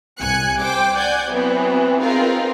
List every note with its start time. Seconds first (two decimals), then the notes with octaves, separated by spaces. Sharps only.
0.19 C2 G#5 F#6 C#7
0.60 C5 G5 D6
0.95 D5 F#5 G#5 G6
1.32 E3 F#3 B3 C4
2.02 C4 D#4 F4 G#4 A#4 B4